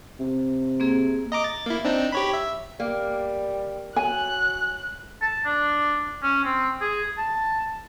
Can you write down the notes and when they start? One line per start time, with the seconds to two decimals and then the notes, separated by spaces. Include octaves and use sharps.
0.20 C3
0.80 A#3 C4 G#4
1.32 D#5 A#5 D6
1.44 A6
1.66 A#3 E4
1.85 C4 D4 D#4
2.12 G4 C#5 B5
2.33 E5
2.80 G3 A#3
3.96 F#3 G#5 F#6
5.22 A5
5.45 D4
6.23 C#4
6.44 C4
6.81 G#4
7.18 A5